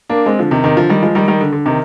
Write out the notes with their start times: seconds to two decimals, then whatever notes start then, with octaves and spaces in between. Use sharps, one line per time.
0.09 A#3 D4
0.26 G#3 C4
0.39 D3 F3
0.51 C3 D#3
0.64 C3 D#3
0.77 D3 F3
0.89 D#3 G3
1.03 F3 G#3
1.15 D#3 G3
1.28 D#3 G3
1.41 D3
1.52 D3
1.66 C3 D#3